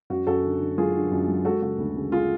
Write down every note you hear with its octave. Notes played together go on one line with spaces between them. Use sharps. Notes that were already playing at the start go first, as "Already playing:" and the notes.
F#2 F#4
F#2 F#4 A4
D3
D3
F#3 F4 G#4
D3
F#2
F#3
G#3 F#4 A4
C#3 F#4
D2
C#3
F4 G#4